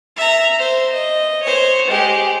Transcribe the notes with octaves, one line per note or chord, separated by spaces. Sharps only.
E5 A#5
C5
D#5
C5 C#5
G#3 G4